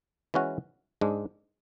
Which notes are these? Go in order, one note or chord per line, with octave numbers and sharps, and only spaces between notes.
E3 G#3 C#4 F#4
G#2 G#3 D4